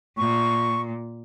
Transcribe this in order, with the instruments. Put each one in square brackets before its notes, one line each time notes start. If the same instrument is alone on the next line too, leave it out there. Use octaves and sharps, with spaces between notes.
[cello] A#2 [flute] C#6